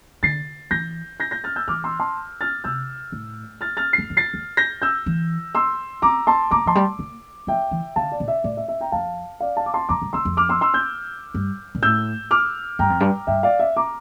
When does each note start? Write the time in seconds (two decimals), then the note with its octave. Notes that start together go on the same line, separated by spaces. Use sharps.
0.23 D3 A6 C7
0.71 E3 G6 A#6
1.20 G6 A#6
1.31 G6 A#6
1.44 F6 A6
1.56 E6 G6
1.68 E3 D6 F6
1.84 C6 E6
2.00 A5 C6
2.41 F6 A6
2.64 C3 E6 G6
3.12 A2
3.61 F6 A6
3.77 F6 A6
3.93 C7
3.98 E2
4.10 F2
4.17 A6 C7
4.34 E2
4.57 G6 A#6
4.82 E6 G6
5.06 E3
5.55 C6 E6
6.02 C4 A#5 D6
6.27 A5 C6
6.51 A#3 A#5 D6
6.66 F3 A5 C6
6.75 G3
6.99 A#3
7.47 F3 E5 G5
7.71 E3
7.96 D3 F5 A5
8.12 D5
8.20 A#2
8.28 E5
8.44 A2 D5
8.57 E5
8.68 E5
8.81 G5 A#5
8.92 F2 F5 A5
9.40 D5 F5
9.57 F5 A5
9.66 D6
9.74 A5 C6
9.89 F2 A#5 D6
10.02 G2
10.13 E2 C6 E6
10.25 F2
10.37 D6 F6
10.49 C6 E6
10.61 C6 E6
10.74 E6 G6
11.34 G2
11.75 A#2
11.82 A2 E6 G6
12.31 D6 F6
12.79 G2 G5 A#5
12.90 F2
13.00 G2
13.27 G2 E5 G5
13.43 D5 F5
13.59 E5
13.77 A#5 D6